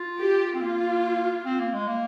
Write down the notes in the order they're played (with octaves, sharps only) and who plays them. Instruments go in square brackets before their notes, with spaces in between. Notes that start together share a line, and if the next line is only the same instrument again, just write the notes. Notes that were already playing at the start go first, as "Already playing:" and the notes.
Already playing: [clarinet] F4
[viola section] G4
[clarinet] C4
[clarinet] A#3 [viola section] F4
[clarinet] C4
A#3
G#3
A#3